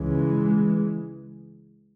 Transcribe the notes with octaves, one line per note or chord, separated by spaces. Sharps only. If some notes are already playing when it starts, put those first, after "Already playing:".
Already playing: C#2 C#3 E3 G#3